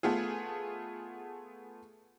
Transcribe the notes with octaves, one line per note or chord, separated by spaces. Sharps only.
A3 B3 F4 G#4